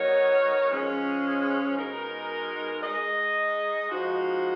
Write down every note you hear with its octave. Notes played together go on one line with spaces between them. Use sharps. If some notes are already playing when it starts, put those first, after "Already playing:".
Already playing: F#3 B3 D#4 A#4 C#5
F3 G#3 C#4 G#4
B2 G#3 D#4 A#4
G#3 D#4 G#4 D#5
F3 G#3 D#4 F#4